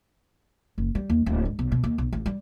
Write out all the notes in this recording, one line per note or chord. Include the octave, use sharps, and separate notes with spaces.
F#1
G3
D#2
D1
G#2
B1
B2
D#2
B1
A1
G3